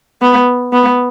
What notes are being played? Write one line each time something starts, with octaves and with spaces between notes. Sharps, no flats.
B3
B3